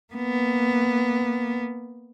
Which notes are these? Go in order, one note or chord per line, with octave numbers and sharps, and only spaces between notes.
A#3 B3